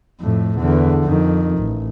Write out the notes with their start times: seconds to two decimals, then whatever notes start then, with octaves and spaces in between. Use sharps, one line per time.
0.20 F2 A2
0.58 E2 D3
1.04 F2 D#3
1.58 A1